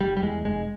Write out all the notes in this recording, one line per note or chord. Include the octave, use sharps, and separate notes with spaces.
F1 G3
G3
E2 G#3
F1 G#3